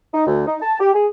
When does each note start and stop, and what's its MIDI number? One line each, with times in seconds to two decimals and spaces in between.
0.14 0.27 63
0.27 0.44 38
0.47 0.56 63
0.61 0.78 81
0.79 0.91 67
0.94 1.07 68